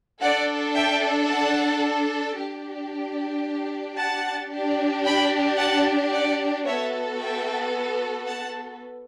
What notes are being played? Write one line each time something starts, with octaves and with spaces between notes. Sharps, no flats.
D4 A4 D5 F#5
E5 G5
F#5 A5
D4 G4
F#5 A5
D4 G4
G5 B5
F#5 A5
D5 F#5
B3 F#4 A4 C#5 E5
E5 G5
F#5 A5